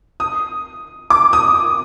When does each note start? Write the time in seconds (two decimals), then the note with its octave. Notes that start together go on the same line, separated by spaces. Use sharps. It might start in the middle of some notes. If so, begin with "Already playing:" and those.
0.20 D#6
1.10 D6
1.33 D#6